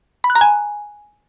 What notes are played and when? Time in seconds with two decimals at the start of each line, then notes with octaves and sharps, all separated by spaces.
0.24 B5
0.30 F#6
0.35 A#5
0.41 G#5